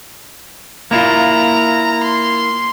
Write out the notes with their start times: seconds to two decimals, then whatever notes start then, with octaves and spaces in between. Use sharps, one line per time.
0.91 A#3 E4 F4 A#5
2.03 C6